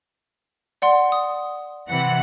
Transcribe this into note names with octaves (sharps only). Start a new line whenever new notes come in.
D5 F#5 C6
D#6
C3 E3 F#5